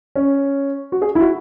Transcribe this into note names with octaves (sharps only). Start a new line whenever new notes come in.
C#4
F#4
G#4
E4
F#4